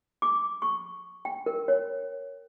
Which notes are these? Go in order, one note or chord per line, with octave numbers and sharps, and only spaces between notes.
D6
C#6
G5
A#4
C#5